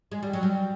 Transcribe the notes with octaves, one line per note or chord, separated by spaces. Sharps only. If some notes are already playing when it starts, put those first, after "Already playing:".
G#3
G3
F#3
G3